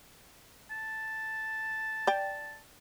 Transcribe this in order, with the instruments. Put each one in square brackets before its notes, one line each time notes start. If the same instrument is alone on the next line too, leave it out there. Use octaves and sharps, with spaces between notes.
[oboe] A5
[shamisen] D5 G5